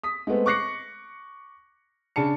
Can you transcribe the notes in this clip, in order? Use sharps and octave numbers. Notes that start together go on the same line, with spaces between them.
D#6 B6
G#3 A3 B3 C4
C#6 D6 F#6 A#6 C7 C#7
C#3 D4 A5 C#7